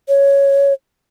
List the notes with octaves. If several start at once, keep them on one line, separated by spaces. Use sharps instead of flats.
C#5